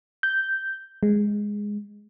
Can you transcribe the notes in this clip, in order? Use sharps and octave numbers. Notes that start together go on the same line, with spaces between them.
G6
G#3